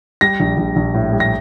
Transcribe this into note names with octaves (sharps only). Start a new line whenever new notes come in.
G3 A#6
A#1
A#1
A#1
A2
G3
A#6